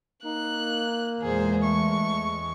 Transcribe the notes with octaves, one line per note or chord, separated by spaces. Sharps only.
A#3 D#4 F#6
E2 A#2 G#3 G#4 C5
A3 C#6